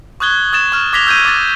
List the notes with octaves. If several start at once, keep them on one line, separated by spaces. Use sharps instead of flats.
C#6 D#6 F#6 G#6 G7
D#6 G#6 A6 E7
C#6 F6 E7
D6 G#6 A#6 B6 F7 G7
E6 G6 G#6 D#7
D6 A6